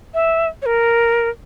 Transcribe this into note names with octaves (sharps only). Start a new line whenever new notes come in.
E5
C#5
A#4